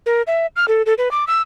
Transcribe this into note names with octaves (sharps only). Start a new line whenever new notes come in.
A#4
E5
F6
A4
A4
B4
D6
E6